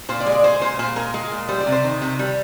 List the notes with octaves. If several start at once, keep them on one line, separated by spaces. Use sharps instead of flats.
A#2 C5
D5
G#3
D5
G#3 C5
A#2 C5
A#2 C5
G#3 A#4
G#3
A#2
G3 C5
D5
C3
C5
D#3
C3
G3